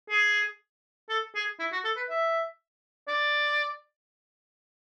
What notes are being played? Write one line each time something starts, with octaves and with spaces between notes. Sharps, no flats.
G#4
A4
G#4
E4
F#4
A4
B4
E5
D5